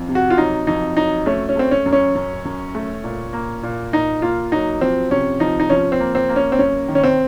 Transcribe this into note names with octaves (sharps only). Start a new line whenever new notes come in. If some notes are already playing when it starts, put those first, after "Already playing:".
Already playing: F2
C3
F#4
F4
F#3 D#4
F2 D#4
F#3 D#4
A3 C#4
C#4
A3 C4
C#4
F#2
C#4
F#2
F#2
A3
A#2
A#3
A#2
A#2 D#4
A#3 F4
F#3 D#4
F3 C4
C3 C#4
F3 D#4
D#4
F3 C#4
C4
A#3
C4
A#3
C#4
C4
F#2 C#4
D#3
C#4
C4